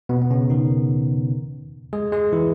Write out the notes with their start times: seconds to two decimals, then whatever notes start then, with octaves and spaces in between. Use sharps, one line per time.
0.09 B2 B3
0.22 B3
0.30 C#3 C#4
0.50 D#3 D#4
1.93 G#3 G#4
2.12 G#3 G#4
2.32 E3 E4